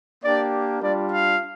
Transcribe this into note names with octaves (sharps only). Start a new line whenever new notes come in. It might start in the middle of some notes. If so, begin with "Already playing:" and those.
A#3 D4 G4 D5
G3 D4 F4 D5
F5